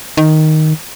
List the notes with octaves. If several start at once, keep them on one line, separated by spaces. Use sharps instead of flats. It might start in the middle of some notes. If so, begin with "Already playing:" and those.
D#3